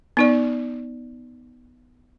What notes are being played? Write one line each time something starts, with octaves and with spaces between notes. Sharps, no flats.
B3 D#4 D5